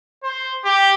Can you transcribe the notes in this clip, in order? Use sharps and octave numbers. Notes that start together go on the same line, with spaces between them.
C5
G4